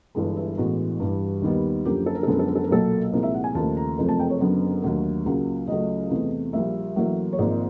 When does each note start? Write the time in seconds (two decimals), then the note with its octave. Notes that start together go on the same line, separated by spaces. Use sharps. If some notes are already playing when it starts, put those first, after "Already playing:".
0.15 G1 G2 E3 G#3
0.37 E4
0.57 A1 A2 E3 G#3 B3 F#4
0.99 G2 E3 G3
1.42 D#2 D#3 G3 B3
1.85 F#2 D3 F3 A#3 G4
2.06 A4
2.15 A#4
2.23 A4
2.27 F#2 D3 F3 G#3 B3 A#4
2.39 A4
2.48 A#4
2.55 A4
2.64 A#4
2.71 B1 A#2 F#3 A#3 A4
3.13 C2 A#2 F3 G#3 A#4
3.23 E5
3.34 F#5
3.44 G#5
3.55 D#2 C#3 F3 A3 A5
3.77 A#5
3.98 F#1 F2 C3 F3 A3
4.09 A5
4.19 G5
4.30 C#5
4.40 F#1 F#2 D3 F#3 B3
4.82 D#2 D3 F#3 A3
5.26 C#2 C#3 F#3 A#3
5.67 C#2 C#3 F#3 A3 D#5
6.10 E2 C3 E3 A3
6.53 A#1 A#2 G3 A#3 E5
6.96 A1 A2 F#3 A#3
7.32 C#5
7.38 G#1 G#2 F3 A#3 D5